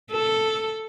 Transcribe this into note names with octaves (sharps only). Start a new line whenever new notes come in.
A4